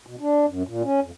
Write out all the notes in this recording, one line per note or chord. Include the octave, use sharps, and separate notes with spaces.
B2
D4
F#2
A#2
C#4
F2